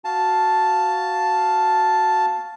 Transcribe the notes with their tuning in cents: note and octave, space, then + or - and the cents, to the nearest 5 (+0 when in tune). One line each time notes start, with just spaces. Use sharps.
F#4 +0 F5 +0 A5 +0